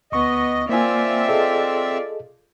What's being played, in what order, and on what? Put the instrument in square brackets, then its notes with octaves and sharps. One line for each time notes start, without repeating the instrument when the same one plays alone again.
[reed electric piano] D2 C#6 [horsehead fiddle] B3 [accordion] D#5
[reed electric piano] A#3 G#5 [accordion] C4 E5 [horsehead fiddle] F4 D5
[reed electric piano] G#4 A4 D#5